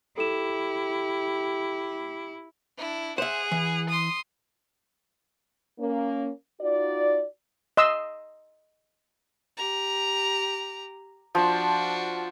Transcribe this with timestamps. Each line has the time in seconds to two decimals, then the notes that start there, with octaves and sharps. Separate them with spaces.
0.18 E4 G4 A4 E7
2.78 D4 E4
3.18 G#4 C5 E5 F#5
3.51 E3
3.90 C6 D#6
5.79 A#3 C#4
6.61 D#4 F4 F#4 D5
7.77 D#5 C6 E6
9.57 G4 A#5
11.35 F3 D4 F#4